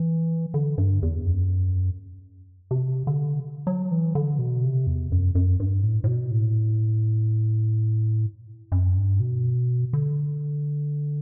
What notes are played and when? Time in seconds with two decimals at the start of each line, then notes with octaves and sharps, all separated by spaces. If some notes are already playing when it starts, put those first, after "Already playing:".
Already playing: E3
0.54 D3
0.78 G2
1.02 E2
1.25 F#2
2.71 C3
3.07 D3
3.67 F#3
3.91 E3
4.15 D3
4.39 B2
4.63 C3
4.87 E2
5.12 F#2
5.35 F#2
5.60 G2
5.83 A2
6.04 A2
6.07 B2
6.31 A2
8.72 F#2
8.96 G2
9.20 B2
9.93 D3